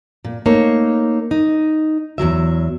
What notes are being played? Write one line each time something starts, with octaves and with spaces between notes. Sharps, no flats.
A#2
A3 A#3 D#4 C#5
D#4
E2 D#3 F#3 E5